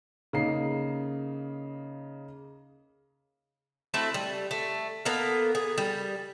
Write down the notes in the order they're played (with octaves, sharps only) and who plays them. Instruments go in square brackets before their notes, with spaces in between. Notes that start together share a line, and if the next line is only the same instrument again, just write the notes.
[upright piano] C#3 A#3 D#4 C7
[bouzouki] A3 C4 E4 F#4
G3
A3
A#3 B3 A4 A#4
G#4
G3